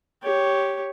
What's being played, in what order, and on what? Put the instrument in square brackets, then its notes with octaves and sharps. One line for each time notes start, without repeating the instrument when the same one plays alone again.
[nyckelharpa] G4 C#5